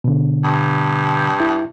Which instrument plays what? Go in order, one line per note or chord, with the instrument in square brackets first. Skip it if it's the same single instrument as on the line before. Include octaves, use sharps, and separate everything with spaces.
[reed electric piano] B2 D3
[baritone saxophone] G2
[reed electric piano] E4